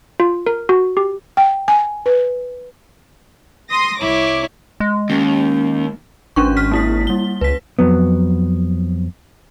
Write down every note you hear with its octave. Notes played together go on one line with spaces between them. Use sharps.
F4
A#4
F#4
G4
G5
G#5
B4
C6 D#6 A#6
C2 E4 C#5 D6
G#3
D#2 C#4
G#1 C#4 D4 C#6
F6 B6
A#3 E4 B6
G3 G7
C#2 B4 B6
F2 F#3 B3